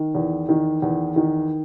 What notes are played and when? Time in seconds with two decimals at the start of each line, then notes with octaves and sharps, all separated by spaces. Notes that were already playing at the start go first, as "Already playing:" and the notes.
Already playing: D#3
0.15 E2
0.49 D#3
0.82 E2
1.16 D#3